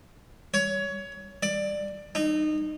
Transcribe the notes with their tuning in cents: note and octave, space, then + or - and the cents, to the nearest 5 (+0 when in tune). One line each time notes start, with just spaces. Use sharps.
C#5 +20
D5 +15
D#4 -25